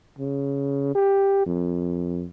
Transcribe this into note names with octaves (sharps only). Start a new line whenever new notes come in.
C#3
G4
F2